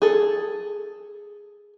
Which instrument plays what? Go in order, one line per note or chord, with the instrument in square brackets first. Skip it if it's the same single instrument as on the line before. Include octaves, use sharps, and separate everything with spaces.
[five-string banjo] G#4 A4